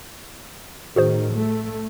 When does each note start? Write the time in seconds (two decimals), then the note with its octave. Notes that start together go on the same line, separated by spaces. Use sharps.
0.96 A2 D#3 F#4 G#4 C5
1.35 A3